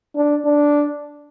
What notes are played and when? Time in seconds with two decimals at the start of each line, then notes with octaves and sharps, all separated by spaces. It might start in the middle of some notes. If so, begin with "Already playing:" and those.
0.16 D4
0.46 D4